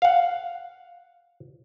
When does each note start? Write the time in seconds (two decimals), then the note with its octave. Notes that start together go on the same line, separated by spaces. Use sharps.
0.02 F5 F#5